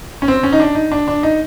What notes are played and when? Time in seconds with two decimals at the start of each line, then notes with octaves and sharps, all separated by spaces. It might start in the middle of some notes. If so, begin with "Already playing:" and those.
0.22 C#4
0.28 C4
0.43 C#4
0.53 D#4
0.60 D4
0.75 D#4
0.92 D4
1.08 D4
1.23 D#4